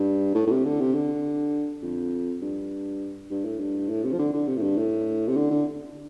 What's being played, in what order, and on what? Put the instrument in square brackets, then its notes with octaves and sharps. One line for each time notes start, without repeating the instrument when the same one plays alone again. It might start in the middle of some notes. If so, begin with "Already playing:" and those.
Already playing: [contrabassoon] G2
A2
A2
C3
D3
C3
D3
F2
G2
G2
A2
G2
A2
C3
F3
D3
D3
C3
A2
G2
A2
C3
D3
D3